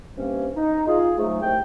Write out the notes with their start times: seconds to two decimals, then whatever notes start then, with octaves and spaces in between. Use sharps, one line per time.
0.15 G2 C3 G3 A#3 C4 C#4
0.55 D#4
0.87 F4 G#4
1.17 G#2 F#3 A3
1.42 C2 C3 A3 G5